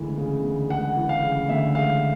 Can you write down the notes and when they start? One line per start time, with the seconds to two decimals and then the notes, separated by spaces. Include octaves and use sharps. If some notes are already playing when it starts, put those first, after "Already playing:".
Already playing: D2 C#3 E3 G#3
0.17 C#3
0.43 D2
0.69 G#3 F#5
0.97 E3
1.09 F5
1.23 C#3
1.49 D2 E5
1.75 G#3 F5